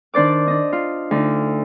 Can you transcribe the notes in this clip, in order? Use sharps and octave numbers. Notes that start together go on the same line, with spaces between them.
D#3 D4 C5 D5 D6
D4 D#5
F4
D2 D#4